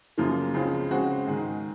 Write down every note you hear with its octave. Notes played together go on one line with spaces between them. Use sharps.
F#2 C#3 F3 A#3 F4
C#2 C#3 F3 C4
C#3 G#3 C4 F#4 C5
G#2 D#3 G#3